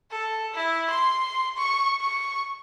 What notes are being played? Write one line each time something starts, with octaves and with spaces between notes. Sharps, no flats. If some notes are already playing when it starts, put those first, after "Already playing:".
A4
E4
C6
C#6
C#6